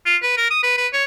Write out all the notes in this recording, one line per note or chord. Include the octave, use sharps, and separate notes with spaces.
F4
B4
A#4
D#6
B4
B4
C#5